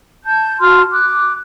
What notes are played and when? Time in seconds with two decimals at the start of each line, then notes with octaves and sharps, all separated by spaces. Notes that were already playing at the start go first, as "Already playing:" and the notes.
0.24 A5 G6
0.61 F#4 A5 C6 F6
0.91 D6 F#6